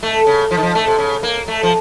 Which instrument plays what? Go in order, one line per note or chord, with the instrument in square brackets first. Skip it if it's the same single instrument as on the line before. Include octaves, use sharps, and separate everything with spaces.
[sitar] A3
C#3
F3
D#3
F3
A3
C3
C#3
A#3
A3
F3